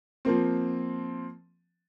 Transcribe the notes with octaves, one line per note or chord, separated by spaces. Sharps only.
F3 A#3 C4